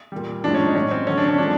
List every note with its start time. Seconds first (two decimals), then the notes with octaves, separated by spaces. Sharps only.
0.12 A#2 G3
0.44 A2 F3 G#3 D4
0.54 C#4
0.65 D#4
0.75 A2 F#3 C#4
0.91 C4
1.07 D3 F#3 C#4
1.18 D4
1.28 C#4
1.38 D3 F3 G#3 D4